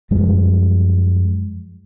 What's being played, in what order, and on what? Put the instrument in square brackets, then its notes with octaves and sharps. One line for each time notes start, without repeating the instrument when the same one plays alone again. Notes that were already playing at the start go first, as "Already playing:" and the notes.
[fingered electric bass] F#2 F3 G3 G#3